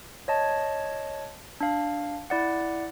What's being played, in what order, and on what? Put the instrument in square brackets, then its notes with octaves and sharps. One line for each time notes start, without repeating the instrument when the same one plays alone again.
[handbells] C#5 D#5 A5
D4 F5
E4 D5 F#5